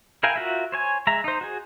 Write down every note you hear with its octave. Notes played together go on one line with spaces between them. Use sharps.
E4 A#4 F5 G5 G#5
F4 F#4 A#4 E5
C5 C#5 G#5
G#3 E5 A#5
D#4 C5
F#4 G#4